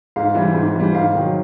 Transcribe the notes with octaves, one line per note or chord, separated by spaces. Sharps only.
G#2 F5
E3 G3
G#2
E3 G3
G#2 F5
D#3 F#3